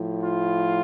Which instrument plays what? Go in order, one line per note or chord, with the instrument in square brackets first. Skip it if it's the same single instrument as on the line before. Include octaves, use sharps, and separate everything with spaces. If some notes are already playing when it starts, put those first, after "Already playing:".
Already playing: [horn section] A2 F3
F4